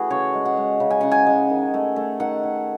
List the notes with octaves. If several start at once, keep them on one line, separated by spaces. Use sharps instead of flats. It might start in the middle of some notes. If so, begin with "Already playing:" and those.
Already playing: E3 A3 F#4 G#4
C#3 C#5
G#3
F#5
G#3
C#3
G#5
C#3 F#5
G#5
G#3
D#3
A3
A3
D#3 F#5
D#3